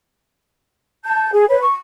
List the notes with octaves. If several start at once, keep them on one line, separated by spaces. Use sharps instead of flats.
A5 G6
G#4
B4 C#5
C#6